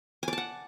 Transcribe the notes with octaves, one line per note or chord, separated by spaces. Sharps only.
D5 F#5 G#5 A5